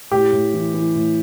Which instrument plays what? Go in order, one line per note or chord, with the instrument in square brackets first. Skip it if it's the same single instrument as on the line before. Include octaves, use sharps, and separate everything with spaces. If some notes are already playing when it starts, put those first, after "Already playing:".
[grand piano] A2 G4
A2
E3
E3
A2